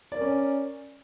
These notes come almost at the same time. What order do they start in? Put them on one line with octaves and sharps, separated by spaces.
D5 A#4 C#4